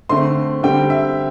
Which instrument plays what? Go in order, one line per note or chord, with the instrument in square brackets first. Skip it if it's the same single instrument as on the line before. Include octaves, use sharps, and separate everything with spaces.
[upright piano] D3 A3 C4 C6
D3 G3 C4 G5
E5